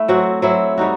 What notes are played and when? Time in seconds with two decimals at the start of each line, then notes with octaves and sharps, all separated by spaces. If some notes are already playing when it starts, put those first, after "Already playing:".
Already playing: A3 E4
0.08 F#3 C4 F#4
0.42 F#3 C4 E4
0.78 G3 D#4 F#4